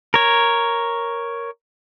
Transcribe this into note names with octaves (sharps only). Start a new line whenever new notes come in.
A#4 C#5